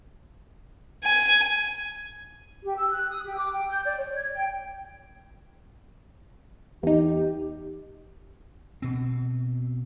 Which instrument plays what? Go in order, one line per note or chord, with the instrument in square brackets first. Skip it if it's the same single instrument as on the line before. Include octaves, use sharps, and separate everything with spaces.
[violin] G#5
[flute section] G4
E6
F#6
D#6
G4
D6
G5
G6
D5
C#5
G#6
G5
[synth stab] E2 D#4 [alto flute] G4
[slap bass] B2 C4